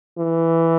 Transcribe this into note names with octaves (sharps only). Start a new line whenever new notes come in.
E3